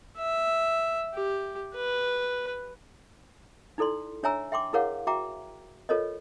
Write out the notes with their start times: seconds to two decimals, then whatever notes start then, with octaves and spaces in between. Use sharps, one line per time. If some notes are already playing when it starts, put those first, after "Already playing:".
0.18 E5
1.14 G4
1.75 B4
3.78 D#4 E4 A4 D5 C6
4.23 D4 C#5 E5 G#5 A#5 E6
4.52 E5 G5 C6 D6
4.73 E4 G#4 A#4 C#5 F5 F#5
5.07 F#4 E5 G5 A#5 D6
5.89 F4 A4 A#4 C5 C#5 D#5